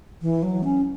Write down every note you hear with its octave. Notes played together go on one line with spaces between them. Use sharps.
E3
F#3
C#4